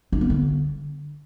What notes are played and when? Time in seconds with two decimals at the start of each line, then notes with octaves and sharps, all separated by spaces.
0.12 D4
0.21 B3
0.30 D3